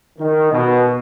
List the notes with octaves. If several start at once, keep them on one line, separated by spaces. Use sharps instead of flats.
D#3
B2